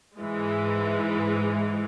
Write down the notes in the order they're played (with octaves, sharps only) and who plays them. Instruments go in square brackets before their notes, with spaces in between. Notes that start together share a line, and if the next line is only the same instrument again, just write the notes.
[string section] G#2 E3 G#3